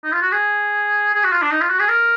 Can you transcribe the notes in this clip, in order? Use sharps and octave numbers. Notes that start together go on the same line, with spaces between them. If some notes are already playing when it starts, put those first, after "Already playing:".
D#4
F4
F#4
G#4
G#4
F#4
F4
D4
D#4
F4
F#4
G#4
A#4